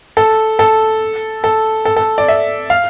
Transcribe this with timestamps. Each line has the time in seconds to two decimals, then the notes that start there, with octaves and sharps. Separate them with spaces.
0.17 A4
0.59 A4
1.44 A4
1.85 A4
1.96 A4
2.18 D5
2.28 E5
2.70 F5